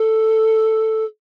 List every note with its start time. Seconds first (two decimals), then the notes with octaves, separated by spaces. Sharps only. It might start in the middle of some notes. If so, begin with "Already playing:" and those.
Already playing: A4